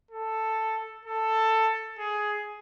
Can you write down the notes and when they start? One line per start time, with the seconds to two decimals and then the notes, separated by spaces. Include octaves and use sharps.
0.11 A4
1.05 A4
1.99 G#4